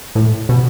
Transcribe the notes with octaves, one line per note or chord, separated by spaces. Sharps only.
A2
B2